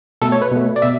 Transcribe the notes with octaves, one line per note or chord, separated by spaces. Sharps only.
B2 A3 A4
C#5
B4
B2 A3
D5
B2 E5